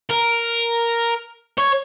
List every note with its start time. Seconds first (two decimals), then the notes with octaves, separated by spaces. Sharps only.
0.10 A#4
1.58 C#5